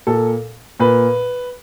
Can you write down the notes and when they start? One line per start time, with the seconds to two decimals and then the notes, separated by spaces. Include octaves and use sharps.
0.07 A#2 A4
0.80 A#2 B4